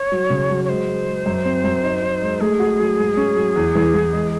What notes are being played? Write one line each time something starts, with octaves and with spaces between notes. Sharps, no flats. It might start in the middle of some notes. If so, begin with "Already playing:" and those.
Already playing: C#5
F#3
C#3
F#3
C#5
G#3 C5
G#3
G#3
F#2
C4
F#2
D#4
D#4
G#3
A3 G#4
F#4
F#3
G#2
C#4
F#3
E2
E3
E3
G#3